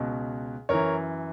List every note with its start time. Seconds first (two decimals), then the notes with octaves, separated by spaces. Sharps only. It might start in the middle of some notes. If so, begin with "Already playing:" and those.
Already playing: C#2 B2
0.69 F#2 E3 A#4 C#5